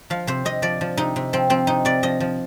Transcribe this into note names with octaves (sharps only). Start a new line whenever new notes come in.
F3 F5
C3 C5
C3 D#5
F3 D5
F3
C3 D#4
C3
F3 C4
F3 C4
C3 D#4
C3 D5
F3 D#5
F3